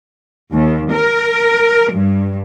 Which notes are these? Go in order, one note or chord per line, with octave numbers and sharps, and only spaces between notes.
D#2
A#4
G2